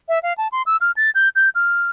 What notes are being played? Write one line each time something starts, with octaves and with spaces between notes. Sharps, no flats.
E5
F5
A5
C6
E6
F6
A6
G6
G6
F6